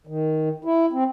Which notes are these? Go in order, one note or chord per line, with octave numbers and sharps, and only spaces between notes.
D#3
E4
C4